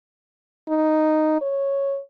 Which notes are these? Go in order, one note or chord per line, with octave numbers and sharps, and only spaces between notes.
D#4
C#5